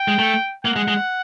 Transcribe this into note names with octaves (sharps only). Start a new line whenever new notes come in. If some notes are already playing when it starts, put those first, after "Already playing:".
Already playing: G5
G#3
A3
A#3 F#5
G#3
G#3